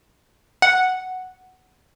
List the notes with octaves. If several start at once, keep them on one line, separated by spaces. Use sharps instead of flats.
F#5